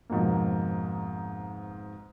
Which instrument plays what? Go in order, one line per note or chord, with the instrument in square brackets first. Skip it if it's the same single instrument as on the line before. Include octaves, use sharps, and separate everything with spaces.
[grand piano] F2 G#2 B2 F3 A#3